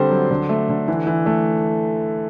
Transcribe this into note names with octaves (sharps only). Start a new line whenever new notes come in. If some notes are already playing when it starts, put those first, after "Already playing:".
Already playing: D3 G3 C4 C5
F#3
D3
A3
D3
E3
E3
A3